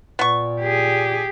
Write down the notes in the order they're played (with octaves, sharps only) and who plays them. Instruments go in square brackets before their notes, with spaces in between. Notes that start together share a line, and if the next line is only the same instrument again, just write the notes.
[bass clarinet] A#2 [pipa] B3 C#6
[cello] G4 G#4